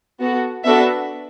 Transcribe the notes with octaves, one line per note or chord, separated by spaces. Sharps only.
B3 F#4 A4
B3 D4 F#4 A4 E5